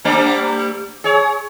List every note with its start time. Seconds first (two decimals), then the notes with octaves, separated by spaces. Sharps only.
0.05 G3 A3 D5
1.04 G#4 C#5